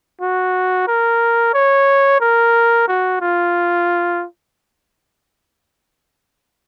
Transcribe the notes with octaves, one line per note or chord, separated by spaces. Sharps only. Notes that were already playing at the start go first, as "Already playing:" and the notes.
F#4
A#4
C#5
A#4
F#4
F4